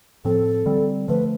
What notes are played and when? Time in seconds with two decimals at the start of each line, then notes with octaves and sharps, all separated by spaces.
0.25 A2 F3 C4 A4
0.66 D3 G3 C4
1.08 D3 F3 A3 B4